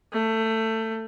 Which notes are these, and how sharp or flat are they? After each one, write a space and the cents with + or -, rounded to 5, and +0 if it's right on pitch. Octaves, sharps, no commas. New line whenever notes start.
A3 +20